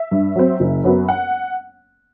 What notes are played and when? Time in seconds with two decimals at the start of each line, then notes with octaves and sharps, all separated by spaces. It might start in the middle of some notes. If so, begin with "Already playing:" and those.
Already playing: E5
0.11 G2
0.35 F#3 C4
0.60 F#1
0.84 F#2 F#3 B3
1.08 F#5